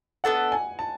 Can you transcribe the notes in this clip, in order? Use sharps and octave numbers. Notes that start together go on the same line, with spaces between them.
B3 D4 A4 F#5
G#5
A5